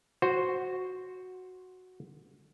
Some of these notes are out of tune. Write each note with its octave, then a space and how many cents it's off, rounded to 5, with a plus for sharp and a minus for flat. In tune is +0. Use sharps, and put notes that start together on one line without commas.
F#4 -5 C5 +0